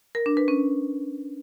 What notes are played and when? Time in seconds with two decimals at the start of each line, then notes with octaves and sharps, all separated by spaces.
0.15 A#4
0.26 D4
0.37 B4
0.48 C#4